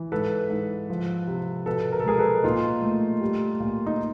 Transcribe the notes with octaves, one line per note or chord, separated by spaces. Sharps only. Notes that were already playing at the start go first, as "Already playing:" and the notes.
Already playing: E3
G#2 A4 B4
G#2
F3
C3
B2 A4 B4
A#4
A4
G#3 G#4 A#4
A4 B4
A#2 D#4 F4
A3
G3
A#2
D#4